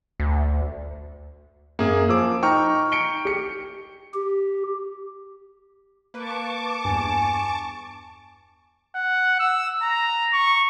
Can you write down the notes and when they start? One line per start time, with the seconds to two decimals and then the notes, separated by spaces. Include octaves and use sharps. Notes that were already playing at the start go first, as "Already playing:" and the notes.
0.20 D2
1.79 F#2 A#3 G#4
2.09 F3 D6 E6
2.43 D#4 G5 A#5 C#6 F6
2.92 C#7 D7 G7
3.25 G4 C#7
4.14 G4
6.14 A#3 B4 A5 C#6 D6
6.85 E2 G2 G#5
8.95 F#5
9.39 E6
9.82 A#5
10.33 C#6